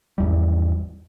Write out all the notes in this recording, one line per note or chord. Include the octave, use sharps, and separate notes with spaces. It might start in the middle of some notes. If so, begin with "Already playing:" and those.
G#1 E2 G3